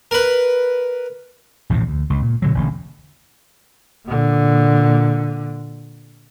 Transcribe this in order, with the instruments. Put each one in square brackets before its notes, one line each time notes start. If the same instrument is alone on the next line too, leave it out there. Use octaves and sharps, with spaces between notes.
[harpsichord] A#4 B4
[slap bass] A#1 E2 A2 C3
D2
C#2
A#2
B2 D3 F#3
E1 A1 D3
[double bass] A#2 D3